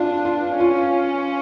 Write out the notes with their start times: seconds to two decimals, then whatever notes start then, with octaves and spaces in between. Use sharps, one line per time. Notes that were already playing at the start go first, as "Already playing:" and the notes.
Already playing: D4 F4
0.25 F4
0.60 C#4 F4